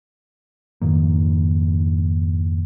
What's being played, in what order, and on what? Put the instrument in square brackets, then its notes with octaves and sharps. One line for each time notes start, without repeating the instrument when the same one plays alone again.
[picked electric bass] F2 G#2 D#3 A#3